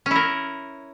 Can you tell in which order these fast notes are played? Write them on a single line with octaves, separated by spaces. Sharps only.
C#4 E4 A#4